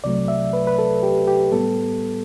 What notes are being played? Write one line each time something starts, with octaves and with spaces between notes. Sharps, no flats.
C2 C3 F#3 A3 D5
E5
B4
B4
A4
G4
G4
A2 G3 B3 A4